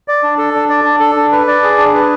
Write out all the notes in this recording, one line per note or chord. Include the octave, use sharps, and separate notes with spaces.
D5
D4
A4
D4
D5
D4
A4
D4
B4
D5
G#4
D4
B4